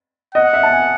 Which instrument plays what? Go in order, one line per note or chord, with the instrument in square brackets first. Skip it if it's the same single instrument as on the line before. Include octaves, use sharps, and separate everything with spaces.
[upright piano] D#5 [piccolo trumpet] F#5
[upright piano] E5
A5
G#5